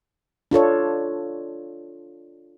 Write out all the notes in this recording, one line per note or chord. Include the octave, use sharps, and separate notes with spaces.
D4 F4 A4 C#5